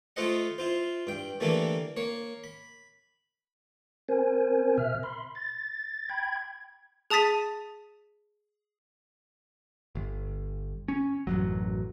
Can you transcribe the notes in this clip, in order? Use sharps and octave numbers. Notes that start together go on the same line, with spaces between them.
A3 F4 A4 C5 D#5 F#5
E4 F4 C5
G2 G5
D3 E3 G3 A3 A#3 A4
A#3 C#5
B5
C4 A#4 C5 G#5
B2 E5 F6
B5 C6
A6
G5 B5 G#6
G#4 A5 D#6 A6 B6 D#7
G1
C#4
A1 F#2 F#3